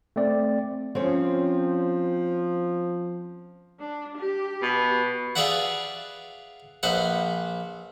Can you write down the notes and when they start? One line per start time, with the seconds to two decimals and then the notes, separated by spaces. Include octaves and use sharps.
0.16 A3 C4 D5
0.95 F3 C4 C#4 C#5
3.80 D4
4.17 G4
4.62 B2
5.36 F4 G#4 B4 D5 E5 F#5
6.83 A#1 B4 C5 F#5